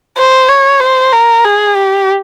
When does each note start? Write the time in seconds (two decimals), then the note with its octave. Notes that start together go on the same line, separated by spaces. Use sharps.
0.18 C5
0.49 C#5
0.80 C5
1.13 A#4
1.45 G#4
1.76 G4